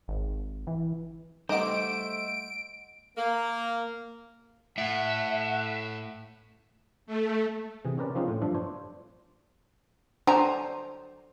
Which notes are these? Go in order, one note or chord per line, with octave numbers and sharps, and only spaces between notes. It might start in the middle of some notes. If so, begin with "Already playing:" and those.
G#1
E3
G3 A3 D#4 G4 C5 D#5 F#5 D7
A#3
A2 E5 F#5
A3
C3 E3 G#4
C4 C#4 G4 A#4 B4 D5
F3 G#3 C4 C#4 D#4 F4
A2
G2 F3 D4 E5
D4 C5 C#5
F#3 D4 C5 G#5 A#5